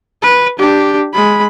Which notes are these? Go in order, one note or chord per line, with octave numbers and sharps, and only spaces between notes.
B4
D4 G4
G#3 B5